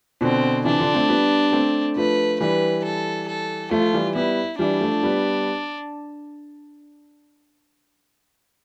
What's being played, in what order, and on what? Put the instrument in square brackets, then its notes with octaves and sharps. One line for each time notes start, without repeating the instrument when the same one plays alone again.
[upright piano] B2 D3 [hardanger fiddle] C4
[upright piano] C3 E3 [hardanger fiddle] D4
[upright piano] D3 F3
A3 C4
G3 B3
A3 C4
[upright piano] F3 A3 [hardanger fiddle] B4
[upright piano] E3 G3 [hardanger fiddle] B4
[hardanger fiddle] A4
A4
[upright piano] F3 A3 [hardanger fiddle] F4
[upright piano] E3 G3
[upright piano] G3 B3 [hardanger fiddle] E4
[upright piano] E3 G3 [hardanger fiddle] D4
[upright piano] F3 A3
G3 B3